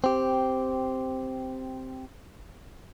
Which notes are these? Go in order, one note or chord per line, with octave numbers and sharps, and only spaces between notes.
C4 G4